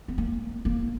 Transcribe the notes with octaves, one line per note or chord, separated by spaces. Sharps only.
B3
A#3
A#3